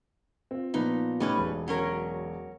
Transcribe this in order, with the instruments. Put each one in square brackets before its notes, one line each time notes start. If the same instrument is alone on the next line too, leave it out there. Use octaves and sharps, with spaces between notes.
[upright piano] C4 F4
[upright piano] A#2 F3 B3 [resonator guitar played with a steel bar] D#4
[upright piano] A2 D#4 [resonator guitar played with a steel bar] G3 C#4 B4
[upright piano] E1
[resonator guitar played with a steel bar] F#3 C#4 A#4